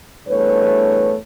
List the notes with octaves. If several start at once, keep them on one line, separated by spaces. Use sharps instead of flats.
E2 G2 A3 B4 C#5